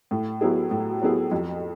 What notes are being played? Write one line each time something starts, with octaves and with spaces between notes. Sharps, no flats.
A2
F#3 B3 E4 G#4
A2
F#3 B3 E4 G#4
F2